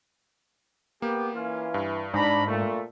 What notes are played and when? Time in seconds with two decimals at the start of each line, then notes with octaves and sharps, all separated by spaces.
1.02 A#3 B3 G4
1.35 E3 C#4 F4 F5
1.74 G2
2.14 G#2 D4 D5 A#5 B5
2.47 A#2 A3